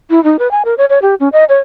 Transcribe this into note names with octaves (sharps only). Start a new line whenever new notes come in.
E4
D#4
B4
G#5
A#4
C#5
C#5
G4
C#4
D#5
C#5